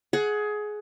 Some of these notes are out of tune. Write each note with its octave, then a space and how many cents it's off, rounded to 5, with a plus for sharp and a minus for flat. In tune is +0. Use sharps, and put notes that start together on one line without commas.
G#4 +20 F#5 +0